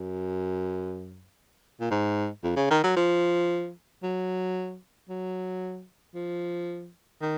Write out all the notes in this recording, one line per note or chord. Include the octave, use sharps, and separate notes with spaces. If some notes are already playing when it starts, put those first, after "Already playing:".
Already playing: F#2
A#2
G#2
F2
C#3
D#3
F#3
F3
F#3
F#3
F3
D#3